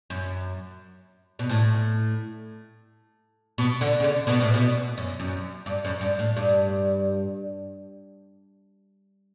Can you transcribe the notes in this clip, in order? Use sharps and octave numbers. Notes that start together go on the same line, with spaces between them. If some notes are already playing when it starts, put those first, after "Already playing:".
F#2
B2
A2
B2
D3
C#3
D3
B2
A2
B2
F#2
F#2
G2
F#2
G2
A2
G2